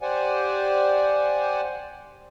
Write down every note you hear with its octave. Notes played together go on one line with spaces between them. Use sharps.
G4 C5 D5 F#5 G#5